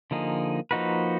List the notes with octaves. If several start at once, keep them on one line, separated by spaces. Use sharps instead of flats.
D3 F3 A#3 D#4 G#4
F3 A#3 D#4 F#4 B4